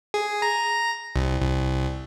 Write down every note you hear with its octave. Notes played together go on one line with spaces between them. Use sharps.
G#4
A#5
C2
C2